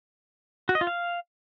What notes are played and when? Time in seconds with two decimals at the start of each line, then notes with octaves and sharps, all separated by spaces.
0.69 F#4
0.75 D#5
0.81 F4
0.87 F5